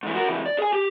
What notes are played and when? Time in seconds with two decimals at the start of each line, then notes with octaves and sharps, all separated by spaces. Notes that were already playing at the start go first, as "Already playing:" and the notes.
0.03 G#2 E3
0.15 F#4 A#4
0.28 C#2 E3
0.46 D5
0.58 G#4 G#5
0.73 G4